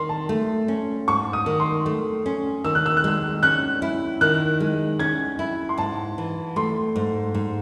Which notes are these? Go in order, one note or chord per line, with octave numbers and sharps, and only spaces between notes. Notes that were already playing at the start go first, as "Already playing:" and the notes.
Already playing: D#3 C6
A5
A3
C#4
G#2 C#6
D#6
D#3
C6
A3
C#4
D#3 E6
F#6
E6
F#6
G#3 E6
C#4 F#6
E4
D#3 F#6
G#3
C#4 G#6
E4
C6
G#2 A5
E3
A3 C6
G#2
G#2